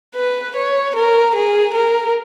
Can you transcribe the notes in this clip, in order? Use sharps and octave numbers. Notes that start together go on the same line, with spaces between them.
B4
C#5
A#4
G#4
A#4